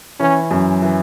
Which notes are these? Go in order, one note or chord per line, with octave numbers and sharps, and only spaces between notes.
E3 C#4
F#2
E3